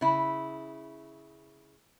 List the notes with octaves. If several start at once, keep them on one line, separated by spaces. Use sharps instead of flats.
C#3 E4